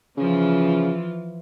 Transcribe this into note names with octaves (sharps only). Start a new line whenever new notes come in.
C#3 E3 F3 F4